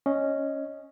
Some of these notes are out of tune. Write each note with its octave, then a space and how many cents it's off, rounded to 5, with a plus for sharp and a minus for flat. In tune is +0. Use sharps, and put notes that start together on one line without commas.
C#4 +0 D#5 +0